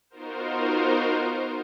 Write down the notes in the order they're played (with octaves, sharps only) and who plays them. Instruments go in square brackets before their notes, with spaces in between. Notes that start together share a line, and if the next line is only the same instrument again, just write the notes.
[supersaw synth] B3 D#4 F4 F#4 A#4 C5